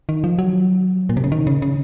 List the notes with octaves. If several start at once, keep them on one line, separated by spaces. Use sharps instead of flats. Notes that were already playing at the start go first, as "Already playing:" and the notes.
D#3
F3
F#3
A#2
C3
C#3
D#3
C#3
C#3